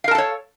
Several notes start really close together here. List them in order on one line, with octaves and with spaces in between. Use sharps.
F5 A#4 A5 A4 C#5